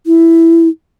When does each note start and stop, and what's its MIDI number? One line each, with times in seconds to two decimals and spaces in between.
0.06 0.68 64